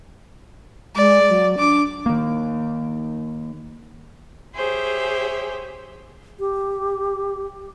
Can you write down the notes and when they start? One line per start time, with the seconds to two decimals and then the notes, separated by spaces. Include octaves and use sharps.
0.95 G#3 D5
1.29 F#3
1.59 D4 D6
2.06 D#3 A#3
4.55 G4 G#4 C5 C#5 E5
6.40 G4